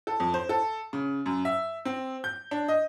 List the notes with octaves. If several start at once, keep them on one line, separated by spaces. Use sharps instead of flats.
A4
F2
C5
A4
C#3
F#2
E5
C4
G6
D4
D#5